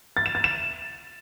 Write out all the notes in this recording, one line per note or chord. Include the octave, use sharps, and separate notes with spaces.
A6
E7
A6
E7